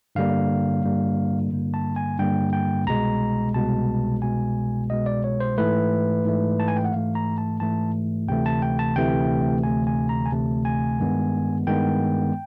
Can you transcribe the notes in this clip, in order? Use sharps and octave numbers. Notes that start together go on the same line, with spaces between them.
G2 D3 G3 A#3 F5
G2 D3 G3 A#3
G2 D3 G3 A#3
A5
G#5
G2 D3 G3 A#3 G5
G5
C2 B2 G#3 A#5
C2 B2 G#3 A5
C2 B2 G#3 G#5
C2 B2 G#3 D#5
D5
C#5
C5
G#2 E3 A3 B4
G#2 E3 A3
A5
G#5
G5
F#5
G#2 E3 A3 F5
A#5
A5
G#2 E3 A3 A5
D2 C3 E3 A3 G5
A5
G5
A5
D2 C3 E3 A3 G5
D2 C3 E3 A3 G#5
G#5
A#5
G#5
D2 C3 E3 A3 A5
G#5
G2 D#3 G#3 B3
G2 D#3 G#3 B3 G5